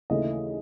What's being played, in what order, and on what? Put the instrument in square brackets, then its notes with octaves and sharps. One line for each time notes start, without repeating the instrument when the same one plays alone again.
[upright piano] D#2 C#3 E3 A3 D#5